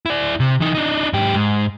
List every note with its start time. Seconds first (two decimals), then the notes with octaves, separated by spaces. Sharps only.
0.06 E4 D5
0.40 C3
0.60 E3 D#4
0.75 D4 D#4
1.13 G#2 G4
1.35 G#2